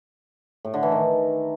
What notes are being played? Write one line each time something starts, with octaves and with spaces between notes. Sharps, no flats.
A2
D3
E3
D#3